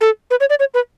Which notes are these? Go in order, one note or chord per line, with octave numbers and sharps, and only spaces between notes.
A4
B4
C#5
D5
C#5
B4